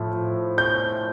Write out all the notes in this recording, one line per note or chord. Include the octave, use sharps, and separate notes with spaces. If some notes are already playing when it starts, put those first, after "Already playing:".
Already playing: A2 F3
G6